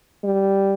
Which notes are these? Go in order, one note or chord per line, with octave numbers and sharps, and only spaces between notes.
G3